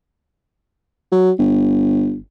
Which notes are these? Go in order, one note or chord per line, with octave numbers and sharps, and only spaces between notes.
F#3
G1